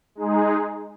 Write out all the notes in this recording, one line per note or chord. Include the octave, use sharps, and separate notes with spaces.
G#3 D#4 G#4